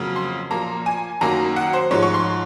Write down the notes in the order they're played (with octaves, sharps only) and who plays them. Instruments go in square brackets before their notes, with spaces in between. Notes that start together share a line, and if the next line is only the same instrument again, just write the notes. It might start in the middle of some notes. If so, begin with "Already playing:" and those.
Already playing: [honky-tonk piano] F2 C#3 F#3 A#3
C6
A#2 F3 A#3 A#5
G#5
F#2 D#3 F#3 A#3 A#5
F#5
C5
G#2 F3 G#3 C#5
C#6
C6